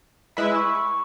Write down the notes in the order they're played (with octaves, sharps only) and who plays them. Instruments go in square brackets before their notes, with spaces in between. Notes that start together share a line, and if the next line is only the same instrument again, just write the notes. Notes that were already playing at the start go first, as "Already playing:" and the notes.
[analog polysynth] G#3 E4 B4 E5 [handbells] B5
[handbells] E6
C#6
C#6